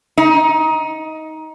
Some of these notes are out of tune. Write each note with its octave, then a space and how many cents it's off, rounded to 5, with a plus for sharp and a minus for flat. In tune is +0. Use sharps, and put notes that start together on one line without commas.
D#4 +20